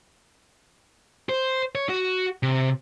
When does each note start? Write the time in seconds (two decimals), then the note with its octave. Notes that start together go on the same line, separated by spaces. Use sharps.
1.29 C5
1.75 C#5
1.89 F#4
2.43 C3